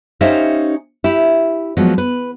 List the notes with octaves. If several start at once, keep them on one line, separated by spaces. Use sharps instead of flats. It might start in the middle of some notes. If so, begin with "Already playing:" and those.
C#4 D#4 G4 C5 E5 F5
E4 G4
F3 F#3 G#3 B3
B4